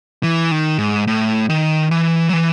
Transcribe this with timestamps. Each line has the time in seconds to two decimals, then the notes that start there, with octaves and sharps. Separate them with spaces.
0.23 E3
0.51 D#3
0.78 G#2
1.07 A2
1.50 D#3
1.91 E3
2.29 F#3
2.33 E3